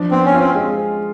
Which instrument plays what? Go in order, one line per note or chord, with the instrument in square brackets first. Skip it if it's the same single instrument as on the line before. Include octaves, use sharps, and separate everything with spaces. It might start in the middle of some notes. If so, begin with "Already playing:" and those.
Already playing: [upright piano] F3 D4
[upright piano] B3 [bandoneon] C4
[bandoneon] C#4
[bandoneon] C4 [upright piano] F4
[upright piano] G#3